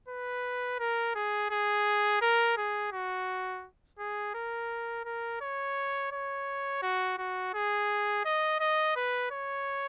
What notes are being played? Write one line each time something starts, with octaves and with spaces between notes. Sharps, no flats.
B4
A#4
G#4
G#4
A#4
G#4
F#4
G#4
A#4
A#4
C#5
C#5
F#4
F#4
G#4
D#5
D#5
B4
C#5